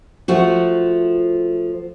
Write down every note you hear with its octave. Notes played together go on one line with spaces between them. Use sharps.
F3 A3 F#4